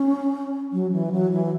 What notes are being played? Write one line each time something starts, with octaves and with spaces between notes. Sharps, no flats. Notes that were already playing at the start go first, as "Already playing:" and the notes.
Already playing: C#4
F#3
E3
F#3
E3